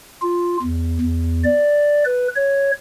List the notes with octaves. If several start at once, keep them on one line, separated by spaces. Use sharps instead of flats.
F4
E2
E2
D5
B4
C#5